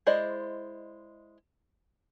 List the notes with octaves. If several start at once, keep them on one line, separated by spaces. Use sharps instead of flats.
G#3 E4 C5 D5 D#5